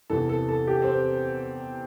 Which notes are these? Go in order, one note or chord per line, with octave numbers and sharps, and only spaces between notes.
E2 C3 E3 A4
A4
A4
G4
C4